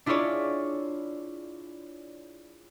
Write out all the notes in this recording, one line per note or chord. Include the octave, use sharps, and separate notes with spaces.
D4 E4 F4 G#4 C#5 D5